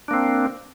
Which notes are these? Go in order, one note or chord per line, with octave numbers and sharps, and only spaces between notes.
A#3 C4 D4